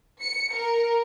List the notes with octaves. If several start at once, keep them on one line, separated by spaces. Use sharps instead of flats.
C#7
A#4